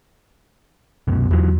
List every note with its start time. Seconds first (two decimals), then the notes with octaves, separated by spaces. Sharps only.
1.08 C2 F#2 B2
1.31 E2 E3 F#3